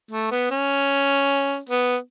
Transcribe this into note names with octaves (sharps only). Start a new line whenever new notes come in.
A3
B3
C#4
B3